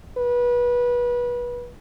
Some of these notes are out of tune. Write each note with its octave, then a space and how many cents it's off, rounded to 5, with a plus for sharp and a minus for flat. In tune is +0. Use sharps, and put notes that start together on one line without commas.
B4 -25